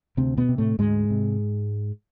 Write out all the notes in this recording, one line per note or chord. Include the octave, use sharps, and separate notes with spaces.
D2 C3 C4
B2 B3
C3
A2 A3
D2 G#2 G#3
C3